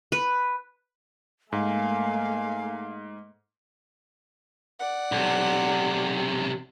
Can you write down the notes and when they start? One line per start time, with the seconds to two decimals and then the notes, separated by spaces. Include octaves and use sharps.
0.12 B4
1.52 G#2 A3 A#3 F5 G#5
4.79 D5 F#5
5.12 B1 C3